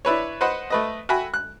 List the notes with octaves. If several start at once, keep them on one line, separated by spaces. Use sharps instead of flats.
D4 E4 B4 C#5
B4 C5 D#5 F#5
A3 B4 D#5
F#4 E5 G5 G#5 B5
F#6